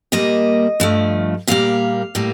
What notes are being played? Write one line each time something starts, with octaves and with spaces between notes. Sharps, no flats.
A#2 G3 A#3 D#5
G2 F3 A3
A#2 G3 A#3 F5
A2 G3 A#3